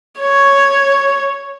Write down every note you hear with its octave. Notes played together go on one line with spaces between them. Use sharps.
C#5